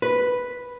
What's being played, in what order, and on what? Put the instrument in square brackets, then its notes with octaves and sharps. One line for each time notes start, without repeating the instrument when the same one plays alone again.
[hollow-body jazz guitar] B4